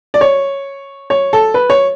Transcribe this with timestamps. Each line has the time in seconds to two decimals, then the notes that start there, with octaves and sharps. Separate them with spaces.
0.14 D5
0.21 C#5
1.10 C#5
1.33 A4
1.54 B4
1.70 C#5